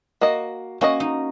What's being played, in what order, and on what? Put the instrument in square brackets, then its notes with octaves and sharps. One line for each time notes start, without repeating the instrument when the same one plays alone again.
[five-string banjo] A#3 F#4 D#5
[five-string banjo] A#3 F#4 D#5 [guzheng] C#4
[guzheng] D#4